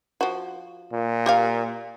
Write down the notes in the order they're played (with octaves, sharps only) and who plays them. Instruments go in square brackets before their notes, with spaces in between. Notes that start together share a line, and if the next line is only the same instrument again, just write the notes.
[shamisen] F3 F#4
[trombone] A#2
[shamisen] G4 A#4 F5